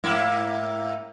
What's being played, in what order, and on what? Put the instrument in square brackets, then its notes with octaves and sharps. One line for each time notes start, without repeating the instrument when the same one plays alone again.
[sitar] G#2 A#3 E4